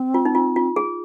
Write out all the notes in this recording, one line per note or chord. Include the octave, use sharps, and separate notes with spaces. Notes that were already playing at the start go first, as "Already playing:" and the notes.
Already playing: C4
F4
D#4
F4
F4
G#4